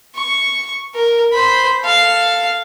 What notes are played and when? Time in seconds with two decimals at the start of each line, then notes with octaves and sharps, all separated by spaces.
0.15 C#6
0.95 A#4
1.32 C5 B5
1.83 A4 F5